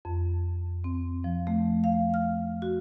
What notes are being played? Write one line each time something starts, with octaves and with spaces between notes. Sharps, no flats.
F2
C4
F3
A3
F5
F6
F#4